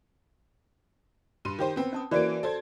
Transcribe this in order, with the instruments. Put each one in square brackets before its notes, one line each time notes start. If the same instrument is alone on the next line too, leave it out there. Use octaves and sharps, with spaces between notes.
[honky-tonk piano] G2 C6 D#7
D#3 G4 C5
B3 C4
[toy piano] C#4 A5 D#6
[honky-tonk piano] E3 A#3 D7 [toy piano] F#4 C5 D5
[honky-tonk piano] A4 C5 G#6